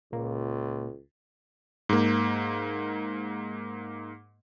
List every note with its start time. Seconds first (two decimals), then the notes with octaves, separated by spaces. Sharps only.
0.13 C#2 A#2 A#3
1.89 G#2 A#3